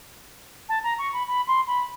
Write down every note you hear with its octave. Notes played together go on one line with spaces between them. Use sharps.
A5
A#5
C#6
B5
B5
C6
B5